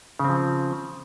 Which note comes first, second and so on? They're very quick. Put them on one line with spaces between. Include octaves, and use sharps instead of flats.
C#3 C4 F3